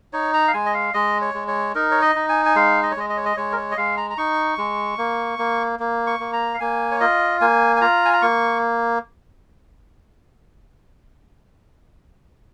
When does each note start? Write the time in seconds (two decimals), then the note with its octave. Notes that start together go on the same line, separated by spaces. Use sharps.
0.13 D#4 C#5
0.34 A#5
0.48 F5
0.54 G#3 G#5
0.66 D#5
0.74 F5
0.94 G#3 D#5
1.21 C#5
1.34 G#3
1.48 C#5
1.75 D#4 A#4
1.91 C#5
2.02 D#5
2.15 D#4
2.29 G#5
2.46 G#5
2.56 G#3 F5
2.83 D#5
2.91 C#5
2.96 G#3 D#5
3.10 D#5
3.17 C#5
3.25 D#5
3.37 G#3 C#5
3.52 A#4
3.57 C#5
3.71 D#5
3.77 G#3 F5
3.97 A#5
4.10 A#5
4.17 D#4 C#6
4.58 G#3
4.98 A#3
5.39 A#3
5.79 A#3
6.07 C#6
6.19 A#3
6.33 A#5
6.54 F5
6.60 A#3 G#5
6.91 C#5
7.00 F4 D#5
7.41 A#3 G#5
7.76 G#5
7.81 F4 A#5
8.05 G#5
8.13 A#5
8.22 A#3 C#6